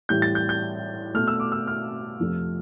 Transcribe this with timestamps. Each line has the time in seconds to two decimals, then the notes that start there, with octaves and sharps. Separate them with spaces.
0.09 A2 E3 G3 G6
0.22 A6
0.35 G6
0.49 G6
1.14 B2 A3 F6
1.27 E6
1.40 D6
1.52 E6
1.67 F6
2.20 F2 C3 F3 A3